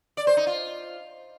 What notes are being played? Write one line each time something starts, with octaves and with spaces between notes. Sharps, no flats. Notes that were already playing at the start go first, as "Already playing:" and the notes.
D5
C5
D#4
F4